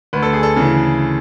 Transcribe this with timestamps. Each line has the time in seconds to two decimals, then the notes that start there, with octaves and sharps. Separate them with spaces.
0.13 D2 B4
0.22 A4
0.33 G#4
0.43 A4
0.56 C#3 E3